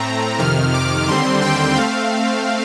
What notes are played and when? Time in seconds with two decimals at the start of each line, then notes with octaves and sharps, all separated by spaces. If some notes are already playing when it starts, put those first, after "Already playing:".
Already playing: A2 A3 C4 A#5
0.39 F2 C3 D#3 F6
0.74 D6
1.07 D#2 D3 G3 C4 C6
1.42 G5
1.76 A3 C4 F5